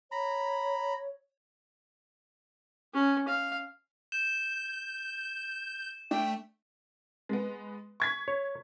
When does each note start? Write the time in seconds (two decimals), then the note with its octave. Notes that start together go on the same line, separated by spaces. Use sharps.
0.12 C#5 A#5 B5
2.94 C#4
3.28 F5
4.12 G6 E7
6.11 A3 D4 G5
7.29 G#3 B3
8.00 C#6 G#6 B6
8.28 C#5